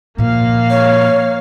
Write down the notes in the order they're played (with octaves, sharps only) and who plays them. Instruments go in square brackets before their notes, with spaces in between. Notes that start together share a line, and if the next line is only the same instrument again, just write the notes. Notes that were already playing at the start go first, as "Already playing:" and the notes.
[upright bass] A#2 F3 [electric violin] A#3 F5
[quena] C#5